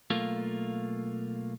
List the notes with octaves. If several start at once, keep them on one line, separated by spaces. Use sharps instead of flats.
B1 A3 A#3 F4